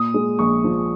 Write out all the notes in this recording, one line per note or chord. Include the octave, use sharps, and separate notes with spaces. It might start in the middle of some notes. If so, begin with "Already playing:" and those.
Already playing: A#2 D#6
G#3
A#1 C#6
F3